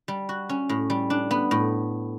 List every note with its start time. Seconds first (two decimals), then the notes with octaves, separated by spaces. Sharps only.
0.08 G3
0.29 F#4
0.49 C#4
0.69 A2
0.90 G3
1.10 D4
1.31 B3
1.51 A2